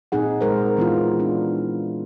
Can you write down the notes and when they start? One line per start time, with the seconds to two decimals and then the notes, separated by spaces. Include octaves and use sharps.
0.12 A#2 C4 D#4 G#4 F#5
0.41 G#3 A#4 C5
0.77 E3 B3 E4 F4
1.20 D4